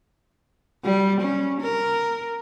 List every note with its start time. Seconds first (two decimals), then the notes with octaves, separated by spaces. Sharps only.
0.84 G3
1.21 C#4
1.61 A#4